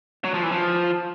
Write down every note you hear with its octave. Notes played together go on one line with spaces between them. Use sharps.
F#3
F3
E3
F3